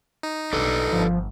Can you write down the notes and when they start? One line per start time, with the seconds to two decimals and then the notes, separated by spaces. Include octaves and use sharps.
0.23 D#4
0.53 B1 D#3 D4 A4 B4
0.92 G1 F3